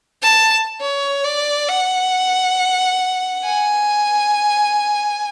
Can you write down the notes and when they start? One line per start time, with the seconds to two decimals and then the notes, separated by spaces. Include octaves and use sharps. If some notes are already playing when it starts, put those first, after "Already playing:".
0.22 A5
0.81 C#5
1.24 D5
1.68 F#5
3.44 G#5